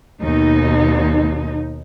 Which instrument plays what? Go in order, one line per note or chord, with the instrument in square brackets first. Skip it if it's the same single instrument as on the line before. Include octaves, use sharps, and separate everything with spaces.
[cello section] D#2 B2 D#4